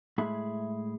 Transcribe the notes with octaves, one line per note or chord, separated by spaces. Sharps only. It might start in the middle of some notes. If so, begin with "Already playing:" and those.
A2 G#3 E4 G#4 E5 B5